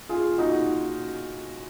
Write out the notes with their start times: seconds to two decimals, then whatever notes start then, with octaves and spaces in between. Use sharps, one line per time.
0.09 F4 G#4
0.38 D#4 F#4